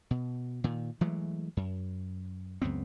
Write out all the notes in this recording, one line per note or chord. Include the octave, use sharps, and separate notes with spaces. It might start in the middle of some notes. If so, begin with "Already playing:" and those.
B2
A#2 D#3
E3 F#3 G#3 A3
F#2
C#2 F#2 B3 C4